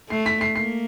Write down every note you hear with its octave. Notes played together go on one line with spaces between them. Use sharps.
A3 C7
B6
C7
A#3 C7